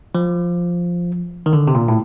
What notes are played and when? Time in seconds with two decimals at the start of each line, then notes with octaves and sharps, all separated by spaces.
0.15 F3
1.46 D#3
1.53 D3
1.68 C3
1.75 A#2
1.88 A2